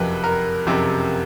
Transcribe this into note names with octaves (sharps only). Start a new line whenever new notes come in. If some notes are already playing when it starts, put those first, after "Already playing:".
Already playing: F#1 F2 C3 B4
A#4
F#1 F2 C3